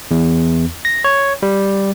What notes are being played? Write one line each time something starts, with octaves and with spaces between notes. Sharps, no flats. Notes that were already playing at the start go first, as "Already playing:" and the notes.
E2
A#6
C#5
G3